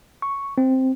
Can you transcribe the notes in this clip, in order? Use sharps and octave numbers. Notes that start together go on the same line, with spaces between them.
C#6
C4